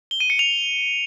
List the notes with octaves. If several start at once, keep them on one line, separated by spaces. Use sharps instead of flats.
G7
D#7
C#7
F7